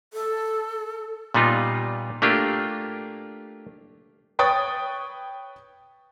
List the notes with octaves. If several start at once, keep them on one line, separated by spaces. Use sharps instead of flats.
A4
A#2 G3 B3 D#4 F4
A3 A#3 D4 F4 G4
B4 C#5 G5 C#6 D#6 A6